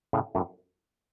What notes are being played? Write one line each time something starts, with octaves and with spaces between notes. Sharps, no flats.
A2 C#3
F#2 A2